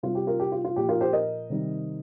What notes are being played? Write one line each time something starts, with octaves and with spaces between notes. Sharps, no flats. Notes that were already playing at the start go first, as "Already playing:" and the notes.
C3 G3 F4
G4
F4 A#4
G4
F4
F4
A#2 F3 G4
F4 A#4
G4 C5
A#4 D#5
C3 D#3 G3